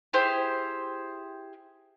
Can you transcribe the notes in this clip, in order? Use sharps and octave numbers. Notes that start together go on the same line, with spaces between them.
E4 G4 G#4 C5